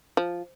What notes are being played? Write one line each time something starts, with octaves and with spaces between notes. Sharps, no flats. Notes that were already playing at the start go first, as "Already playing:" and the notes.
F3